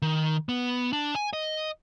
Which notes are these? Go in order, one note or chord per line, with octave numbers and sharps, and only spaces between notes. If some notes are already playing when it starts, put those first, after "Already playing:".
D#3
B3
D4
G#5
D#5